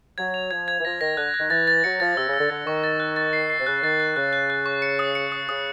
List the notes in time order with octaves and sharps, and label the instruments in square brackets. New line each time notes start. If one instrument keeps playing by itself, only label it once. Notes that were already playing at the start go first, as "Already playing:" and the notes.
[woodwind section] F#3 [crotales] G#6
[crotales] F7
[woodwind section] F3 [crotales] G#6
[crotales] G#6
[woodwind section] E3
[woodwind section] F3 [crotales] A#6
[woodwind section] D#3 [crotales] A#6
[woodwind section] D3 [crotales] F#6
[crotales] F#6
[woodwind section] D#3
[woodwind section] E3 [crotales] A6
[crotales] A6
[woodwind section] F#3 [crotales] C#7
[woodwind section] F3 [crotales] A6
[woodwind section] C3 [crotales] E6
[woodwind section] C#3
[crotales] E6
[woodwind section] D3
[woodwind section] D3 [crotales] A6
[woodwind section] D#3 [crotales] C#6
[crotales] A6
F#6
A6
C7
C7
[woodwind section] C3
[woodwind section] C#3 [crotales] F#6
[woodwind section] D#3 [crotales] A6
[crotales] F#6
[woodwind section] C#3 [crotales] F#6
[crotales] F#6
F#6
C#6
C#7
D#6
C#7
D#6
[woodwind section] C#3 [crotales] D#6